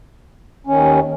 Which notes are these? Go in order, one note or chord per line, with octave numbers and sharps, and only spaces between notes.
D#2 D#3 C#4